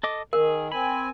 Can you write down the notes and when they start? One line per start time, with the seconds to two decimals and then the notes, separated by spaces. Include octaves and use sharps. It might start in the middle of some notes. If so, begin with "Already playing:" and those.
0.03 A4 D#5 D6
0.33 D#3 G#4 A#4
0.72 C4 G#5 B5